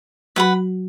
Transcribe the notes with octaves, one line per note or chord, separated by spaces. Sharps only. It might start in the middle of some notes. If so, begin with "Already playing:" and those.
F#3 F#4 B4 F#5 B5